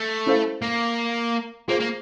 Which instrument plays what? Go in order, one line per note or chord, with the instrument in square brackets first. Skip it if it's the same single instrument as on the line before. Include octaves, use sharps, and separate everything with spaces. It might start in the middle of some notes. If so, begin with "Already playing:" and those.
Already playing: [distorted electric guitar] A3
[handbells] C#4 E4 A4 C5 F5
[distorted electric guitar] A#3
[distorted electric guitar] A#3 [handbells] F4 G#4 C5 F5
[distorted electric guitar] A#3